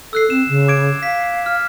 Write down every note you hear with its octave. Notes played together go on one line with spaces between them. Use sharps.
A4 E6 F#6 C7
C4 E7
C#3
D6 G#6 D7
F5 B6
F6